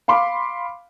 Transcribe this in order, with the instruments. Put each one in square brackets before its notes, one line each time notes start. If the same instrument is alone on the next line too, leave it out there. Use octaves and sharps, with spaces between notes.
[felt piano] F5 B5 C6 D6